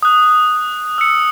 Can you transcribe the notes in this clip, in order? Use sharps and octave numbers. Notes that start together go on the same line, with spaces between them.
D#6 F#6
E6 C#7